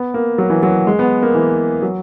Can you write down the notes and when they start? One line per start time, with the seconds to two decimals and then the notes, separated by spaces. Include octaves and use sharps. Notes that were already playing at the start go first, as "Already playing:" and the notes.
Already playing: B3
0.14 A#3
0.38 F#3
0.50 E3
0.63 F#3
0.87 G#3
0.99 B3
1.22 A#3
1.35 E3
1.82 F#3